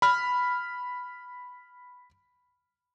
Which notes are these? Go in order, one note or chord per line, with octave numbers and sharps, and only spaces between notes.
B5 F6